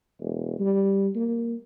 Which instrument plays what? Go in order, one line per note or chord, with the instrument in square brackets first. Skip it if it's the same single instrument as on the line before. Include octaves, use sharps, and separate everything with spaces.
[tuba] E1
G3
A#3